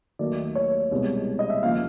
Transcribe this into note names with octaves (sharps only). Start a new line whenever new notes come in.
D#2 D#3 F#3 A3 D5
C#5
C2 B2 G#3
D#5
E5
D#2 C#3 F3 F5